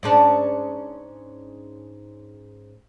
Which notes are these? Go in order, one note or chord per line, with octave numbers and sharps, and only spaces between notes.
G#2 C#4 D4